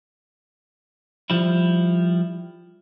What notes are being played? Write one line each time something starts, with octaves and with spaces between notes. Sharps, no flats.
F3 G3 E4